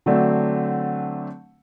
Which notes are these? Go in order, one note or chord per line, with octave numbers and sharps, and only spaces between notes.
D3 F#3 A3 C4 D4